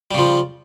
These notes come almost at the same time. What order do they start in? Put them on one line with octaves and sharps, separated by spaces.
G3 C#3 F3